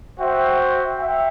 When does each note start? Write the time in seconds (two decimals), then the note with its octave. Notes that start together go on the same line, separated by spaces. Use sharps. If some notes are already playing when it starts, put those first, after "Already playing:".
0.19 F#4 C5 E5 G5
0.99 E5 G5